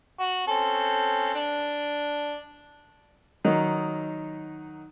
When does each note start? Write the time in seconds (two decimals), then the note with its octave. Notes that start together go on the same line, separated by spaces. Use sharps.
0.19 F#4
0.48 C4 C#4 A4
1.35 D4
3.45 D#3 F#3 D#4